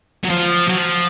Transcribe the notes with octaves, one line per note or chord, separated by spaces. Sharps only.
F#3
F3
F#3
F3